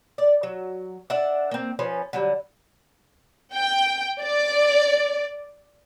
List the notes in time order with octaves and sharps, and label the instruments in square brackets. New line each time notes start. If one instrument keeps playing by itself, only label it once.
[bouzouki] D5
F#3
D4 D5 E5 F#5
A#3 C4
F3 C#4 B4
D3 F#3 G3
[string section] G5
D5